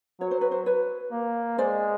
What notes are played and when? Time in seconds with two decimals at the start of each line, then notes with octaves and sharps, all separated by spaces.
0.20 F#3 C#5
0.31 C5
0.41 B4
0.51 C5
0.66 B4 C#5
1.12 A#3
1.58 G#3 C5 D5